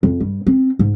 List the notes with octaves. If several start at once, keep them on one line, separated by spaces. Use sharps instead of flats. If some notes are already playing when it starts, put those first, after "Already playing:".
F2
G2
C4
G#2